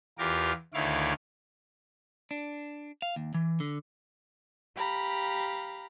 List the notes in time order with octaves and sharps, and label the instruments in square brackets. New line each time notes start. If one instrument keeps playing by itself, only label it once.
[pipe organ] E2 F4 G4 A#4 D6
D2 D#3 E4 C#5 F5 D6
[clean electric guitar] D4
F5
D#2
E3
D3
[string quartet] G4 F5 A#5 B5